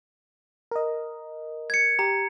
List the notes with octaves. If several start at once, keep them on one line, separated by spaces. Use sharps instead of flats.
A#4 D#5
G#6 C#7
G4 A#5